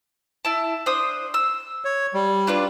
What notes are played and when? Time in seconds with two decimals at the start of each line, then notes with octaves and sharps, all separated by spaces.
0.45 E4 A5
0.86 D4 C5 D#6
1.34 E6
1.85 C#5
2.14 G3
2.47 D4 F4 B4